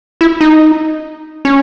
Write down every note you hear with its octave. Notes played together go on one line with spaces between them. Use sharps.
E4
D#4
C#4